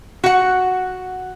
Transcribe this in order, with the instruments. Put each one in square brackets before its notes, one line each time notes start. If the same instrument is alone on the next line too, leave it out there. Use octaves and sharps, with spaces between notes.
[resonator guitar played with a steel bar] F#4 F#5